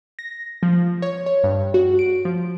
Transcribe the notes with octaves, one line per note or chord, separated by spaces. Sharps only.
A#6
F3
C#5
C#5
G2
F#4
D7
F3